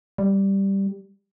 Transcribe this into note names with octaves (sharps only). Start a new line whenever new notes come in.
G3